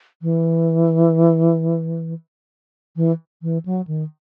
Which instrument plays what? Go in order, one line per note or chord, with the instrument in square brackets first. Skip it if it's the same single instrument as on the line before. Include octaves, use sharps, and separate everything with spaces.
[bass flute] E3
E3
E3
F#3
D#3